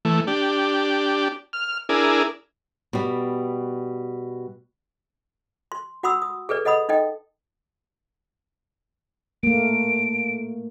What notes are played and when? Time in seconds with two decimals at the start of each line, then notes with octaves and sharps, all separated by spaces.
0.05 E3 A3
0.27 D4 G4
1.53 F6
1.89 D4 E4 G#4 A#4
2.93 B2 G3
5.72 C6
6.03 F#4 F#5 B5 C6 D#6 E6
6.22 D#6
6.49 G#4 A4 B4 D5
6.65 A4 D#5 F#5 B5 D#6
6.89 D#4 A4 D#5 G5
9.43 A3 A#3 D7